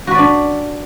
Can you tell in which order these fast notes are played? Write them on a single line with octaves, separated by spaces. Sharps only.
F#4 B4 D5 D4